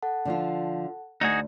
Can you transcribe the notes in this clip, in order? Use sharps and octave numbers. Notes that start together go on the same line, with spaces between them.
A4 F#5 A5
D3 F3 F4
D2 D#4 F#4 G#4